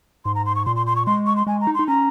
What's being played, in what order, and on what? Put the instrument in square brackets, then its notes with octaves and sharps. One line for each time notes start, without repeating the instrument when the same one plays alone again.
[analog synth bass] G#2 [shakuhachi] C6
[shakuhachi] A#5
C6
C#6
[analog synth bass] A#2 [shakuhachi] C6
[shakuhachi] C6
C6
C#6
[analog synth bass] G#3 [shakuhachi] C6
[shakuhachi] C#6
C6
[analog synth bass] G#3 [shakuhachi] G#5
[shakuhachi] A#5
[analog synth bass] D#4
[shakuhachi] C6
[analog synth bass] D#4
[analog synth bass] C#4 [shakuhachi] A#5